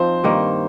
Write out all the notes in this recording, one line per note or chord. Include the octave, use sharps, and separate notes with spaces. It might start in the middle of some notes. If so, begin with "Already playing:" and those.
Already playing: F3 C4 D#4 C5
G2 D#3 A#3